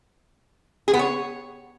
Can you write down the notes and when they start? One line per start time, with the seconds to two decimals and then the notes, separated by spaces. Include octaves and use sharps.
0.88 G#4
0.94 B3
0.99 C#5